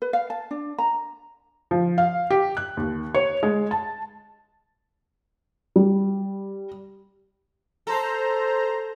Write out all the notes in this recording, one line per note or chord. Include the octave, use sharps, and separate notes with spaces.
B4
F5
A5
D4
A#5
F3
F5
G4
F#6
D#2
C#5
G#3
A5
G3
A4 C5 A#5